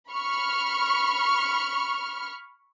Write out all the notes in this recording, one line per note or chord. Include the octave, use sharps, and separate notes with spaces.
B5 C#6 F6